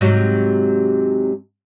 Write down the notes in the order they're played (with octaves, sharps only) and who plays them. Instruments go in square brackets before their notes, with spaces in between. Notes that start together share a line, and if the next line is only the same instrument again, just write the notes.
[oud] G#2 C3 F#3